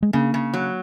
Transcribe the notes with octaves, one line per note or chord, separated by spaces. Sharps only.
G#3
C#3 A#3
C#3
F#3